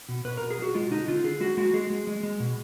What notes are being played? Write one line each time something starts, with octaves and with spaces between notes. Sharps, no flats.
B2
B2 B4
B2 A#4
G#4
F#3
F#4
G#3 F4
D3 D#4
D3 F4
D3 G#4
G#3 F#4
G#3 F#4
G#3 G#4
G#3
G#3
G#3
B2